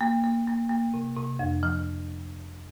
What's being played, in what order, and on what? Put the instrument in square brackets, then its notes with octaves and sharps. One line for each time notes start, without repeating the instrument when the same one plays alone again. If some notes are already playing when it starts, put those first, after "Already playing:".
[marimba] A#3
A#3
A#3
A#3
C3
C3
F2
F3